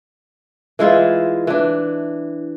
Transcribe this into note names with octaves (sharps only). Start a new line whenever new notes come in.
E3 G#3 E4 F4
E3 D4